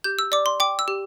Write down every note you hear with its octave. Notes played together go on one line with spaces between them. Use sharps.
G4 G6
E6
D5 D6
C6
G5 D6
E6
G4